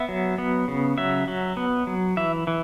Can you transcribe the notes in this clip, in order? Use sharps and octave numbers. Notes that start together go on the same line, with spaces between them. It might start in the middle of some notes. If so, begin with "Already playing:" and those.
Already playing: B3 E5
F#3
B3
C#3
F#3 E5
F#3
B3
F#3
E3 E5
E3